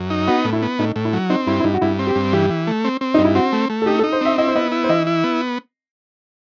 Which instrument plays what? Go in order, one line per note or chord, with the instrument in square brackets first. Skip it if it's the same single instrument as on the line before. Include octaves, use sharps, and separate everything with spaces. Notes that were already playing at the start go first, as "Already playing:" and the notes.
Already playing: [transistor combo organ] F#2
D#4
[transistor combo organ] B3 [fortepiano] F#4
[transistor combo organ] A2
[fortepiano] E4
[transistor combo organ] B3
[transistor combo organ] A2 [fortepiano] D#4
[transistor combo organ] A2
[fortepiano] E4
[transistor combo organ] F#3
[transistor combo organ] C4 [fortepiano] D#4
[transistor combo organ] G2 [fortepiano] E4
[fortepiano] E4
[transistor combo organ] G2 [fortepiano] D#4
[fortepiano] F#4
[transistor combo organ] G2 [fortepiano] E4
[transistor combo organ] C4
[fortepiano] G4
[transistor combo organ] G2
[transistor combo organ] E3 [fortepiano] G4
[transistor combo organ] E3
A3
C4
C4
[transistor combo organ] G2 [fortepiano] D#4
[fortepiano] E4
[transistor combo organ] C4 [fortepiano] F#4
[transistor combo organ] A3
A3
[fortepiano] A4
[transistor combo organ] D#4 [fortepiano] G4
[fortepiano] A4
[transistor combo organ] D#4
[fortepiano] C5
[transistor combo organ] C4 [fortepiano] E5
[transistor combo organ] E4 [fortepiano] D#5
[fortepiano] C5
[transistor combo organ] B3 [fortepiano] D#5
[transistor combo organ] E4
[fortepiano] C5
[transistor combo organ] E3 [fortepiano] D#5
[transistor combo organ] E4
B3